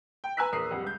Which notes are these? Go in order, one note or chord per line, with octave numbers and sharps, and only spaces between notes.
G5
B4 G#5 A#5 E6 F#6 B6
A#1 E2 A#4 D#6 C7
F2 G3 F#5
C#2 G6